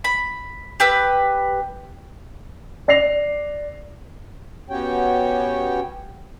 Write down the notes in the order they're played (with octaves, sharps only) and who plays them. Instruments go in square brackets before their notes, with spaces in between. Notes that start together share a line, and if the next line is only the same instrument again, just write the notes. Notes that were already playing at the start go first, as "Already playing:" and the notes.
[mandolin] B5
G4 B4 E6
[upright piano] D5 A#6 C7 F7
[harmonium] B3 C#4 F#4 G4 C#5 G5